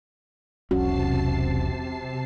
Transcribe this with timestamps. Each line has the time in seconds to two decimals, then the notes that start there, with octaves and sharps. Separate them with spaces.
0.71 E1 B1 C3 C#4 F#4 A5 C7